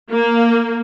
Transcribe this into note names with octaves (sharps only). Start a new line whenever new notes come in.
A#3